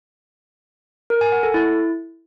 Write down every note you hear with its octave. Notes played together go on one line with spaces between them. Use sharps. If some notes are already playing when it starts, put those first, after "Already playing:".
A#4
G#5
F#5
A4
E4